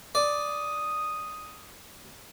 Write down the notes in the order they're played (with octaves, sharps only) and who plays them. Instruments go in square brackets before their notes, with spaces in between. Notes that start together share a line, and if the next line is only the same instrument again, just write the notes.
[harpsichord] D5 [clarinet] D#6